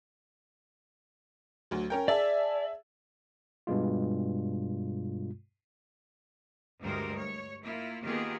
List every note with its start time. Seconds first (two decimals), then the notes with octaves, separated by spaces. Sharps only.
1.71 D2 F#3
1.90 C#4 A#4 G5
2.08 G#4 D5 E5 A5
3.67 G2 B2 G#3 F4
6.81 D2 G2 G3 G#3 A#4 C5
7.15 C#5
7.64 A#3 E4 F4
8.03 D#3 A#3 B3 F4 G4 G#4